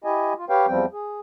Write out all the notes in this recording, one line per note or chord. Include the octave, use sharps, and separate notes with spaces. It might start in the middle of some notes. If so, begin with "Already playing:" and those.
E4 G4 D#5 G#5
F4
G4 B4 C#5 F5 G5
E2 F3 G3 C4 G5
G#4